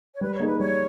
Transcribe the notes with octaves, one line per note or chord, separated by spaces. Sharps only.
C#5
G3 B4
C#5
A#3 D#4 G#4
B4
G3 C#5